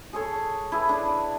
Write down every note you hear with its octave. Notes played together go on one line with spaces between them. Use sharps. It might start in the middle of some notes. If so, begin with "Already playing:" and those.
G#4 A4 C#5
E4 G#4 B4
D4